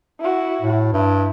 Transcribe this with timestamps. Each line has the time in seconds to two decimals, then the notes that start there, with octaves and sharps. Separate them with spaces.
0.20 E4 F#4
0.61 A2
0.93 G2 E4